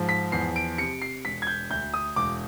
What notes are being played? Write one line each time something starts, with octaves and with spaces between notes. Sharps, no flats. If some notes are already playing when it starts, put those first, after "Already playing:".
Already playing: G#2 F3
B6
E2 C7
D7
C3 C#7
C7
E1 B6
G#6
G6
D2 G6
D#6
E1 D6